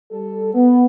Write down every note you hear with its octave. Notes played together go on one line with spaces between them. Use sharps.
G3 A4
B3